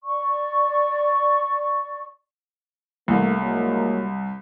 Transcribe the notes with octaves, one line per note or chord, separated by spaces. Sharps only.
D5 C#6
C2 A3 A#3
F#3 G#3 A#3